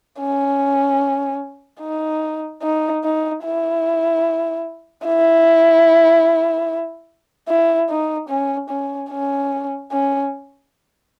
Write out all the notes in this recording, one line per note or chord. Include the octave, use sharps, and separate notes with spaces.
C#4
D#4
D#4
D#4
E4
E4
E4
D#4
C#4
C#4
C#4
C#4